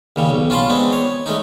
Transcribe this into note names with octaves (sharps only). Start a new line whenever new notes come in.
D#2 C#3 G3
B1
C#4 F4 A5 B5 C6
G#3 B3 C4 D4
C#5
G#3 A3 C#4 D#4